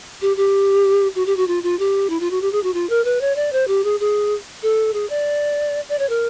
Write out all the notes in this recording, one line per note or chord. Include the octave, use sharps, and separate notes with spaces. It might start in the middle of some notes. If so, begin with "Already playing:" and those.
G4
G4
F#4
G4
F#4
F4
F4
G4
E4
F4
F#4
G4
G#4
F#4
F4
A#4
B4
C#5
D5
C5
G4
G#4
G#4
A4
G#4
D5
D5
C#5
A#4